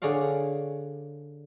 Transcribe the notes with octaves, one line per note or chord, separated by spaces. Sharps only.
D3 G#4 C#5 D5 F5